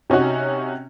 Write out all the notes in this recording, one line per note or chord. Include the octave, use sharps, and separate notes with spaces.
C3 C#4 D#4 F#4